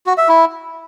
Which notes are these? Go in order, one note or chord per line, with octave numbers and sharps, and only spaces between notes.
F#4
E5
E4